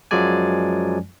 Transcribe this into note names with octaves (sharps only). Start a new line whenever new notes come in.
F#2 F3 F#3 G#3 D5 G#5